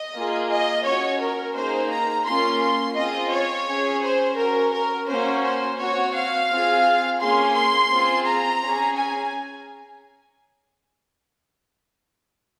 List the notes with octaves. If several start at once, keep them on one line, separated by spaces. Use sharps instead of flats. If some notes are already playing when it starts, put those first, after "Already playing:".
Already playing: D#5
A#3 F4 G#4
D#5
C#4 F#4 C#5
A#4
A#3 D#4 G#4 C5
A#5
A#3 C#4 F4 C6
C6
C4 F4 G#4 D#5
C#5
C#4 G#4
C5
C#4 F#4 A#4
A#4
A#3 C#4 F#4 C5
C5
C4 F#4 C#5
F5
C4 F4 G#4
A#3 C#4 G#4 C6
C6
C4 F4 G#4
A#5
C#4 G#4
G#5